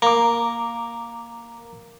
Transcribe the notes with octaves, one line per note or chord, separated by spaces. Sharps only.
A#3 A#5 D6